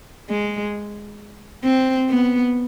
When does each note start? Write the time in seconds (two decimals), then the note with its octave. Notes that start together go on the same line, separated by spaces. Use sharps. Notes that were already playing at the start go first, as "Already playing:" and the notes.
0.30 G#3
1.64 C4
2.09 B3